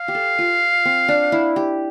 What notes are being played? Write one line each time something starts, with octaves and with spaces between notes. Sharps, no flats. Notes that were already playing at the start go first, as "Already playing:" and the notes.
Already playing: F5
G4
A4
F4
C4
D4
E4
G4